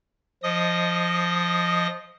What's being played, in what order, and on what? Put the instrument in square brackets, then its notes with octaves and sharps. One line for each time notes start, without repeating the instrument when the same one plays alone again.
[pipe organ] F3 D#5 D#6